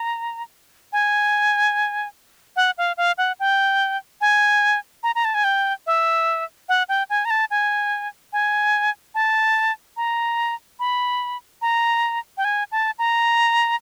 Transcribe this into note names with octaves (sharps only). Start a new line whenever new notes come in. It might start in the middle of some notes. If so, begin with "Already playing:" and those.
Already playing: A#5
G#5
F#5
F5
F5
F#5
G5
G#5
A#5
A#5
A5
G#5
G5
E5
F#5
G5
G#5
A#5
A5
G#5
G#5
A5
A#5
B5
A#5
G5
G#5
A5
A#5